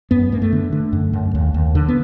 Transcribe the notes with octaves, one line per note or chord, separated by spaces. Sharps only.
F#2 B3
F#2 A#3
A3
D3
D3
F#2
F#2
D#2
D#2
D3
B3